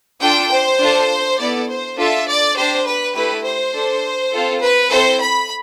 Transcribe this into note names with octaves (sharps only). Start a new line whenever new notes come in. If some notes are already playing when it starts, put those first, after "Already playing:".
D4 F4 A4 G5
C5
D4 F4 A4
B3 E4 A4 D5
C5
D4 F4 A4 E5
D5
D4 G4 C5
B4
A3 E4 G4 B4
C5
D4 A4
C4 F4 A4
B4
C4 E4 A4 C5
B5